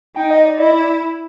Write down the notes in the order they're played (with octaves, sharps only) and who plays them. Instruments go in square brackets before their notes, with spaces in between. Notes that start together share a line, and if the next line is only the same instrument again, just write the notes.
[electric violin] D#4 [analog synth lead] G5
[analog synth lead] D#5
D5
[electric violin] E4 [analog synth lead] D#5
[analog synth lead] D5